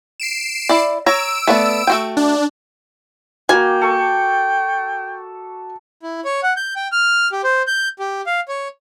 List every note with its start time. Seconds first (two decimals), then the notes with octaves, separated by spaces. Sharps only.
0.20 C7 D7 E7
0.69 E4 D5
1.06 C#5 A#5 E6 D7
1.47 A3 B3 D5
1.87 A3 F#4 G5
2.17 D4
3.49 A#3 F#4 G5 G#5
3.81 A4 C#6
6.03 E4
6.25 C#5
6.43 F#5
6.57 G6
6.76 G5
6.92 F6
7.32 G4
7.44 C5
7.67 G6
7.99 G4
8.26 F5
8.48 C#5